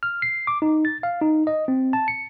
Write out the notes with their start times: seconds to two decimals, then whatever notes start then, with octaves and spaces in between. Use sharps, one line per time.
0.03 F6
0.22 C7
0.47 D6
0.62 D#4
0.85 A6
1.03 F5
1.22 D#4
1.47 D#5
1.68 C4
1.93 A5
2.08 C#7